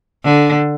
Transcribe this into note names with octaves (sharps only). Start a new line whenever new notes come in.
D3